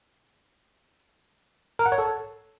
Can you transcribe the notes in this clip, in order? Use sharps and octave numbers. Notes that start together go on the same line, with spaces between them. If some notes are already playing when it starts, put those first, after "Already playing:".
A#4
F#5
C#5
A4